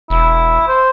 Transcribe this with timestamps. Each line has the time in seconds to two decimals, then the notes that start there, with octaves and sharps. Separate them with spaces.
0.10 E1 E4
0.68 C5